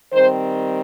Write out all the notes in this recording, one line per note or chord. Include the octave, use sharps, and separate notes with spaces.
D#3 G3 C4 C5